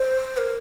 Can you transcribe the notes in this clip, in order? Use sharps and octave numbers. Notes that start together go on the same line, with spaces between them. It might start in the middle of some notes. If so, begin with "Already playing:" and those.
Already playing: C5
A#4